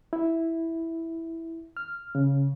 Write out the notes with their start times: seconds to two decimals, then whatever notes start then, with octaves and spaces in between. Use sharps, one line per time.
0.13 E4
1.77 F6
2.15 C#3